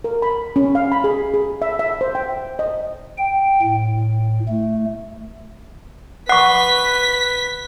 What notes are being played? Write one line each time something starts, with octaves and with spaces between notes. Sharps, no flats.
A#4
B5
C#4
F5
B5
G#4
G#4
E5
E5
C5
G5
D#5
G5
A2
A3
B4 F#5 C#6 F#6 B6